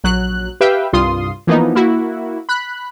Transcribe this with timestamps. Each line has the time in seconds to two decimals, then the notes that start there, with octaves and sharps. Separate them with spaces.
0.04 A#1 F#3 F#6
0.61 G4 B4 E5 F5 G5
0.93 C2 G2 F4 C6 D#6
1.47 E3 F3 A#3 B3 D#4
1.75 A#3 E4 F#4
2.49 B5 F#6